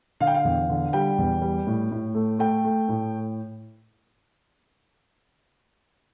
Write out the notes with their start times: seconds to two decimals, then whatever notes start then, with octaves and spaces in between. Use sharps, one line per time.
0.20 D3 F5
0.27 G5
0.34 F5
0.45 E2
0.69 D3
0.93 G3 G5
1.18 E2
1.42 G3
1.67 A2
1.91 A2
2.15 A3
2.39 A3 G5
2.64 A3
2.88 A2